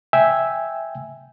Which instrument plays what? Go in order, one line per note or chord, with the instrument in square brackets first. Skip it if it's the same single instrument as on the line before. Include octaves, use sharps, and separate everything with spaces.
[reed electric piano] E5 G5 G#5 E6